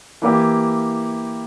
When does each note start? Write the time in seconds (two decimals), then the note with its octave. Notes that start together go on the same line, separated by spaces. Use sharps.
0.22 E3 A#3 E4 G4